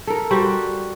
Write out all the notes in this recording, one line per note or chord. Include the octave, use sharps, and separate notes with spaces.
A4 A#4
G3 F#4 G4 C5